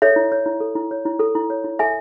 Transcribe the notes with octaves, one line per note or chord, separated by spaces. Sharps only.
A4 C#5 E5
E4
C#5
E4
A4
E4
C#5
E4
A4
E4
C#5
E4
A4 E5 G#5